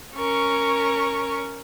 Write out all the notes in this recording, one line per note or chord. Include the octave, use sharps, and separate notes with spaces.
C#4 A#4 C#6